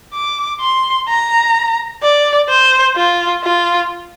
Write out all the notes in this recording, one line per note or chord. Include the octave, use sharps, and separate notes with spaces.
D6
C6
A#5
D5
C5
F4
F4